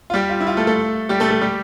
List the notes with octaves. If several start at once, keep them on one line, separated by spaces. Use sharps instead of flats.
F4
G3 G4
F4
E4
F4
A3 A4
A3 A4
G3 G4
A3 A4
A3 A4
G3 G4